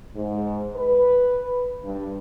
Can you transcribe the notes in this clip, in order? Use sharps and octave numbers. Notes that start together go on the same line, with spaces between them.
G#2
B4
G2